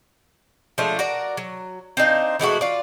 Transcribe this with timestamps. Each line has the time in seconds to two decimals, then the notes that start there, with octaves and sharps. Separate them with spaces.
0.78 F3 G#3 A3 D4
0.99 F#4 A#4 D5
1.37 F#3
1.97 C4 D4 D#4 F5
2.39 E3 G#3 A3 F#4
2.61 F4 D5